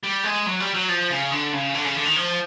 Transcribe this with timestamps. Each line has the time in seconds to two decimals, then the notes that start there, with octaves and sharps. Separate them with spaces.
0.04 G3
0.24 G#3
0.46 F#3
0.60 G3
0.74 F#3
0.89 F3
1.10 C#3
1.31 D3
1.53 C#3
1.74 D3
1.84 C#3
1.96 D3
2.06 D#3
2.16 F3